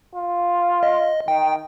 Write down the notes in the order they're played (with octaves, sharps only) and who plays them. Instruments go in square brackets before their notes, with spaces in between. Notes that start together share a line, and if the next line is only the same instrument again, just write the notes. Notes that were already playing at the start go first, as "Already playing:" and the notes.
[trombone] F4
[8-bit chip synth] D#5
[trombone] D#3 [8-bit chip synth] G5